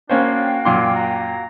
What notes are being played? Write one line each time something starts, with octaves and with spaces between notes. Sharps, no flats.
A#3 C#4 D4 F#4 C5 F5 G5
F#2 A#2 C6 D6
A#5